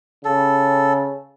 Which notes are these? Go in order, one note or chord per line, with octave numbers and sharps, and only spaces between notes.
C#3 A4